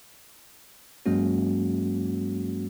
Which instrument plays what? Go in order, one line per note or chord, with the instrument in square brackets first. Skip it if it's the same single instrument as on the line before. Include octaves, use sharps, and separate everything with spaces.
[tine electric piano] G2 F#3 G#3 A#3 C#4 F#4